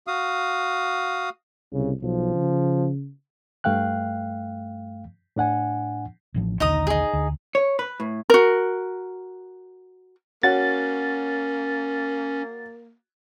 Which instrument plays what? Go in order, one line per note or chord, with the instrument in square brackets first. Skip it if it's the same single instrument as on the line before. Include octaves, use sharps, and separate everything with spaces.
[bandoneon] F#4 F5 D#6
[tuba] C2 [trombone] C#3
[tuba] B1 [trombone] F3
[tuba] C#3
[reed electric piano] G2 A3 F5 G5 F#6
A2 D4 F#5 G#5
[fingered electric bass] A1 A2 F3
[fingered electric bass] A#1 D#2 D3 [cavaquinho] D#4 A#5 D#6
[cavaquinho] D#4 G#4
[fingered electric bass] D2
[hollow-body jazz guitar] C#5
B4
A2
[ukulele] F#4 A#4
[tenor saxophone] A#3 [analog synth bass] C#4 [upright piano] F#4 C#5 F#5 [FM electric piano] A6